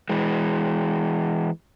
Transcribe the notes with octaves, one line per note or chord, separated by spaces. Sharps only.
E3 G#3